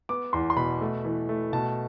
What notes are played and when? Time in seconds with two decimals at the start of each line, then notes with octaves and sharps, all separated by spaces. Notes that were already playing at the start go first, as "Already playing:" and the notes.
0.09 B3 D6
0.33 E2 C6
0.50 C6
0.56 B2 B5
0.81 A3
1.05 E3
1.29 A3
1.53 B2 A5